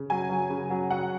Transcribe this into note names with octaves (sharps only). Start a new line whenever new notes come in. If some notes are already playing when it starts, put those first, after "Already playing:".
Already playing: C#3
F#3 G#5
F#3
C#3
F#3
F#3 F#5